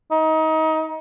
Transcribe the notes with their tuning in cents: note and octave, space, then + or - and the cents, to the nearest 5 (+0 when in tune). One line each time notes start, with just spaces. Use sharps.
D#4 +25